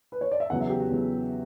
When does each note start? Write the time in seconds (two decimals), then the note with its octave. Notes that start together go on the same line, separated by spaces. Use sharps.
0.12 B4
0.21 C#5
0.31 D5
0.40 E5
0.50 E2 C#3 F#3 F#5
0.60 E5
0.69 G4
0.80 F#4
0.89 E2 C#3 F#3